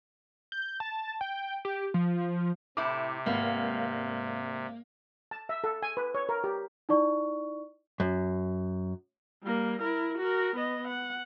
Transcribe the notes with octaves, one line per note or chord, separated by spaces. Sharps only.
G6
A5
G5
G4
F3
A2 C3 E4 D6
G#1 G3 A#3 B3 F5
A5
E5
A4
G#5
B4
C#5
A#4
G4
D#4 E4 D5 C#6
F#2
G3 A#3
E4 A#4
F#4 A#4
B3 D#5
F#5